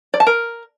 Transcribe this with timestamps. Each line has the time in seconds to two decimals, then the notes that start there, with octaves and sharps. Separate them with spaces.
0.14 D5
0.20 A5
0.27 A#4